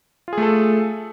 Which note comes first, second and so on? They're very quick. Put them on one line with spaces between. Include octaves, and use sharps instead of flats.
F4 G#4 A3 A4